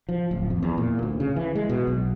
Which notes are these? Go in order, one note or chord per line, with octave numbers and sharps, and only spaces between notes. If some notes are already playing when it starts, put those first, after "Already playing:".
F3
D1
F2
E2
A#2
D2
C#3
E3
G#3
B2
B1